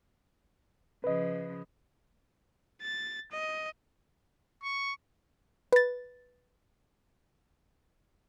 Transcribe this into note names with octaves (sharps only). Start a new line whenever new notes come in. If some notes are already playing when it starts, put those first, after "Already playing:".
C#3 F3 B4 D#5
A6
D#5
C#6
B4 A6